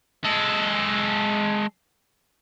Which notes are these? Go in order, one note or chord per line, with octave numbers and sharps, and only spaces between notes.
G#3 A4